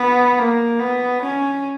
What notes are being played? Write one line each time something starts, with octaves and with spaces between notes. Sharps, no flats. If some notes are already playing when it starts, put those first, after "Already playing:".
Already playing: B3
A#3
B3
C#4